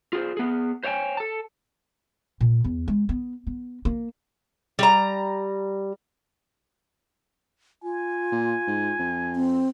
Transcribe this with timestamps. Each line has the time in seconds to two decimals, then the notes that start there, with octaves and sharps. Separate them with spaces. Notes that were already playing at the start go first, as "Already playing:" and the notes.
0.13 F4 G#4 A#4 C5
0.37 B3 G#4
0.83 C5 C#5 E5 G5 G#5
1.17 A4 A5
2.41 A#2
2.64 E2
2.88 G#3
3.09 B3
3.47 B3
3.85 A#3
4.79 G3 A#5
7.83 F4 G#5
8.32 A#2
8.67 G#2
8.99 F2
9.36 C4